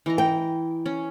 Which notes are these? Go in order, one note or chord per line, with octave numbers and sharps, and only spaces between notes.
E3 D#5 A#5
G5
C#4